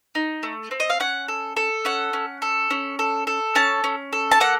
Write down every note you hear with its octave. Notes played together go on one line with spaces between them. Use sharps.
D#4
A3
C4
D#5
F5
C#4 F#5
A4
A4
C#4 F#5
C#4
A4
C#4
A4
A4
C#4 A5
C#4
A4
A5
A#3 F#5